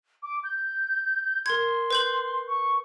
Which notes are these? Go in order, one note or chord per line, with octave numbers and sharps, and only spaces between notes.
D6
G6
A#4 C6 G#6
B4 G6 F#7
C#6